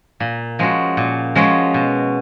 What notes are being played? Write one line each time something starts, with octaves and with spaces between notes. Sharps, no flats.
A#2
F3 G#3 C#4 F#4
A#2
F3 G#3 C#4 F#4
B2